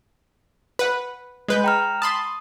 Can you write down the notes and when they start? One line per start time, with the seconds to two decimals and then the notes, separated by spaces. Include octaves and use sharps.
0.79 B4 F#5
1.48 G#3 B4 G6
1.64 G5 A#5 F6
2.02 A5 B5 C6 D#6